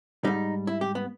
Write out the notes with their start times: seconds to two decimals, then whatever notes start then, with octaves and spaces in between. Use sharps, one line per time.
0.24 G#2 G3 D#4
0.67 E4
0.81 G4
0.95 B3